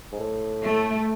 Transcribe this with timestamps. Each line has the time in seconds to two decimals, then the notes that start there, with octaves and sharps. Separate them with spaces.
0.12 G#2
0.20 A2
0.64 A3